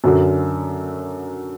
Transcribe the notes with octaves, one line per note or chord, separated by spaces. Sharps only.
F#2 D3 F#3